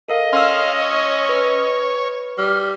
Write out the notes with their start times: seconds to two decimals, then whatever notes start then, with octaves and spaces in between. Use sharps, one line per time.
0.08 A4 A#4 D#5 F5
0.33 C#4 F5 C6 E6
0.82 C#5
1.29 B4
2.38 G3 F6